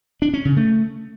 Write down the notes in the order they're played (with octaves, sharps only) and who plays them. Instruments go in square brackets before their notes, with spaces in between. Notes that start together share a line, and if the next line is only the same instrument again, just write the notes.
[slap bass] D4
C#4
C#3
A3